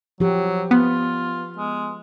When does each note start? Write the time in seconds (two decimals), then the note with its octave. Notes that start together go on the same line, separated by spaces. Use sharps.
0.20 F3 F#3 G4
0.71 B3 F4
1.58 G#3